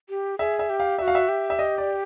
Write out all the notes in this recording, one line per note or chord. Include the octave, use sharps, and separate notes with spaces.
G4
G#4 E5
E5
G4
F5
G4 E5
F#4
F5
E5
G4
E5
D#5
D5